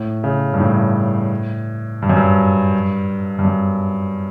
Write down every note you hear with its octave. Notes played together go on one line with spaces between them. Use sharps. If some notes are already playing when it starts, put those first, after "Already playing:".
Already playing: A2
C#3
G2
A2
G2
F#2
G2
G2
F#2